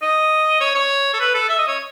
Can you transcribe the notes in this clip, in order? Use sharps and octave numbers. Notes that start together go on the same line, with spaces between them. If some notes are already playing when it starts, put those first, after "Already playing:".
D#5
C#5
C#5
A4
B4
A4
E5
D#5
C#5